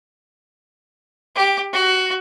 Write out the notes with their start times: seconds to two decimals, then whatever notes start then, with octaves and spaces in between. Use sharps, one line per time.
1.36 G4
1.73 F#4